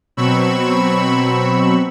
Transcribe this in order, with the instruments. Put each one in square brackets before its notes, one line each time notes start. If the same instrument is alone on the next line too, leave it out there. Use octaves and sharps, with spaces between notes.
[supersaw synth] B2 F#3 C4 B5 C#6 E6